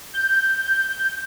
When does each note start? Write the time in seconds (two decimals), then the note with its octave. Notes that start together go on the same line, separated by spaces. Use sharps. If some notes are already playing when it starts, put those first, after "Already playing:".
0.13 G6